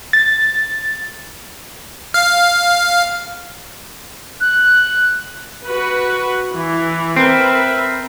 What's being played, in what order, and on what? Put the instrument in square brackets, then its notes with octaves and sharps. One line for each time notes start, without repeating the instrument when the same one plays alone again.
[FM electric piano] A6
[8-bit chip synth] F5
[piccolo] F#6
[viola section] F#4 B4
E3
[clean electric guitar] C4 [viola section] A#4 B4 E5